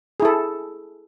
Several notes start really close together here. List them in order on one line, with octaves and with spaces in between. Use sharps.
G#4 E4 A4